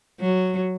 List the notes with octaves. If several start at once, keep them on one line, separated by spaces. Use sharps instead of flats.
F#3